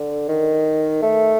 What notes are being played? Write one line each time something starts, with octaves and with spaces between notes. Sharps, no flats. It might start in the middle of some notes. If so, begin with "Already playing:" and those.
Already playing: D3
D#3
A3